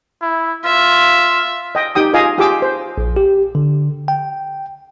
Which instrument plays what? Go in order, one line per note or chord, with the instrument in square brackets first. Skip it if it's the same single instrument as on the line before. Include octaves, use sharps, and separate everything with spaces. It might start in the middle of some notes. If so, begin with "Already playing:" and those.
[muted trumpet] E4
[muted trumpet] F4 [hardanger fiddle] E5
[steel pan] D#5 G5
D#4 G4 G5 D#6
F4 G#4 D#5 F5 G#5
F4 G4 G#4 G5 D6 E6
C5
[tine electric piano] A#1
G4
D3
G5